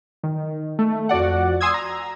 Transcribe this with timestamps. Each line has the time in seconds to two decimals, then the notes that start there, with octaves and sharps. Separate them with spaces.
0.23 D#3
0.79 A3
1.09 F2 F#4 D5 F#5
1.61 G#5 C6 D#6 E6 G#6
1.74 A#5